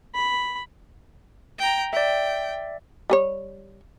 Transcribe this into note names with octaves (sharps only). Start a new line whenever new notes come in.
B5
G5 A#5
D5 E5 G5
G3 G#4 C#5